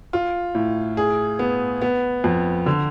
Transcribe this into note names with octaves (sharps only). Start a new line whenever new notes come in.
F4
A2
G#4
B3
B3
F2
D3